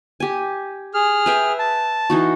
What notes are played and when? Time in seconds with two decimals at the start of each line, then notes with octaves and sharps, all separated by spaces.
0.20 G4 G#5
0.94 G#4 F6
1.26 B4 E5 G5
1.59 A5
2.10 E3 D#4 F#4